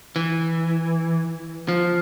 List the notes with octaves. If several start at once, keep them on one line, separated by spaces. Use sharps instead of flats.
E3
F3